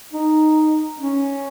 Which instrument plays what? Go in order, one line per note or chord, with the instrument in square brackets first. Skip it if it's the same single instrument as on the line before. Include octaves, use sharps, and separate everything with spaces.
[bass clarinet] D#4
C#4